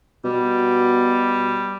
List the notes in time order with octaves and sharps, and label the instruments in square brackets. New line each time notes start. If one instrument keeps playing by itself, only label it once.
[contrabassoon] B2 [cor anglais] G3